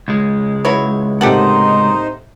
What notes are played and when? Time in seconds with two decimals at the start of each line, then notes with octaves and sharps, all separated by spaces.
0.08 C#2 G#3
0.65 F#3 E4 B4 C#5
1.21 A2 C3 A#3 D#4 G4 A4 C5 F#5